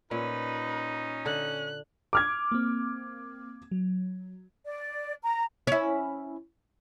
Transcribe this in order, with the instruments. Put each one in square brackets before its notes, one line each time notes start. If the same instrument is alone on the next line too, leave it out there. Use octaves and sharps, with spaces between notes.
[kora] A#2 [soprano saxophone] C#4 [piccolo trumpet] D#4 [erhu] B4
[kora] D3 [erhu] F#6
[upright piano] D6 F6 G#6
[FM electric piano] A#3 C4
F#3
[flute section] D5
A#5
[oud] C#4 E4